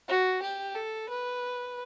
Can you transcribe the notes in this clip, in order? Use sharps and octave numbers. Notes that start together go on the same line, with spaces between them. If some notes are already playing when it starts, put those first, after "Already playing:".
F#4
G4
A4
B4